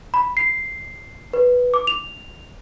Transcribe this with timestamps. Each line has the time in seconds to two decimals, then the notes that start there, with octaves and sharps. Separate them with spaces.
0.14 B5
0.37 C7
1.33 B4
1.74 D6
1.87 F7